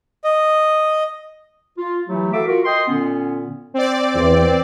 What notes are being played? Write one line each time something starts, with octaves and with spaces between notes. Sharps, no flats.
D#5
F4
E3 F#3 A3 E4 G4
F#4 A4 E5 F5 D6
F4 F#4 A#4
D#5 G5 C6
A#2 D3 B3 C#4
C4 D5
E2